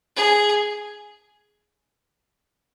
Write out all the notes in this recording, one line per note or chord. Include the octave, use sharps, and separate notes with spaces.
G#4